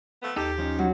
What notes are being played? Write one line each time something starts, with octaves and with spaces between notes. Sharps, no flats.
F3 A3 B3
D#2 D#4 G4 A4 D6
F3 C#4 D#4
F#3 F#5